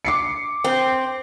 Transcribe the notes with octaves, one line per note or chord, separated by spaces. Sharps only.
D6 C7 C#7
C4